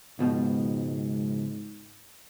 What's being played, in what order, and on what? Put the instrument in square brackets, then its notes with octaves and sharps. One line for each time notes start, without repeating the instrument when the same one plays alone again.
[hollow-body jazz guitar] C#2 B2 F3 [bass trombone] G#2